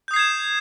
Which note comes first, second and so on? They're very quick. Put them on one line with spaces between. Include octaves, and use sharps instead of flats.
G6 D#6 C7 G#6 E7